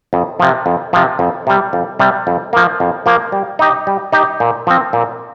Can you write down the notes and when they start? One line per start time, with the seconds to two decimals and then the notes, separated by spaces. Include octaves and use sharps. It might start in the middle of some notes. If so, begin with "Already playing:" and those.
0.13 F2
0.40 C3 F3
0.66 F2
0.93 C3 F3
1.19 F2
1.47 C3 G3
1.73 F2
1.99 C3 G3
2.27 F2
2.53 F3 A#3
2.80 F2
3.06 F3 A#3
3.32 G3
3.59 D#4 G4 D#5
3.87 G3
4.13 D#4 G4 D#5
4.40 A#2
4.67 F3 C4
4.93 A#2